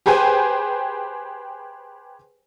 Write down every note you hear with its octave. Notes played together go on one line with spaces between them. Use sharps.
G4 G#4 B4 C5 G5 G#5